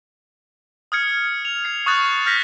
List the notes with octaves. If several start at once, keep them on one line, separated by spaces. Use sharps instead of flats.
D#6 F6 G#6 C#7
F7
G#6 C7
C#6 D#6 F#6 A6
F6 G6 A#6 B6